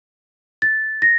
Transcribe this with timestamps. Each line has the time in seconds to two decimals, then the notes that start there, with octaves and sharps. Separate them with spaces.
0.62 A6
1.02 A#6